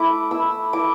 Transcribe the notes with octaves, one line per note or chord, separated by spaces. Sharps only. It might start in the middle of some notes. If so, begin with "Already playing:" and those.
Already playing: A3 E4 D6
E4 E6
E4 D6